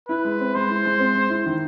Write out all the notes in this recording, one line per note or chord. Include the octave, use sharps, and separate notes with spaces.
E4 B4
G#3
C4
G#3 C5
E4
G#3
C4
G#3
E4
D#3